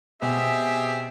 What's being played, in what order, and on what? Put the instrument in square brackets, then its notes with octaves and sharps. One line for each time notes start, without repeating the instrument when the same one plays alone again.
[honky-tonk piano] B2 [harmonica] C4 G4 G#4 [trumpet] E5 [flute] G#5